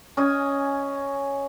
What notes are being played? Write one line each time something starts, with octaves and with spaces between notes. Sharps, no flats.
C#4 D#5 G#5